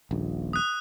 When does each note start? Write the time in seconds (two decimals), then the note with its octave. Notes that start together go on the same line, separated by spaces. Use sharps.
0.11 D#1 A#1
0.53 D#6 F#6